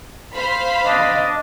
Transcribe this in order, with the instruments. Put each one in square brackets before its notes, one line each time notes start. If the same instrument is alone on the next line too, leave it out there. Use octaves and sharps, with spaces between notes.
[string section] C5 F5 B5
[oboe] D4 [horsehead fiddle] D#5